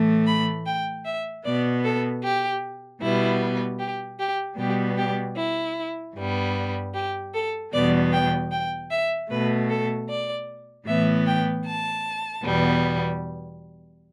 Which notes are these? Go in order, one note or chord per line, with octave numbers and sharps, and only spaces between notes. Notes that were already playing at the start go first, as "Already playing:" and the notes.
Already playing: A2 E3 A3
B5
G5
E5
B2 B3 D5
A4
G4
B2 G3 B3 E4
G4
G4
B2 G3 B3 G4
G4
E4
G2 G3 B3
G4
A4
E2 B2 G3 B3 D5
G5
G5
E5
B2 A3 B4
A4
D5
A2 E3 B3 E5
G5
A5
E2 B2 G3 B3